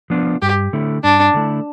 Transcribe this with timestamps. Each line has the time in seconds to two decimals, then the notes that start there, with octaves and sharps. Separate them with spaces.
0.10 F3 B3 D4 F4
0.42 G2 G4
0.73 D3 A3 E4
1.04 G2 D4
1.34 D3 A3 E4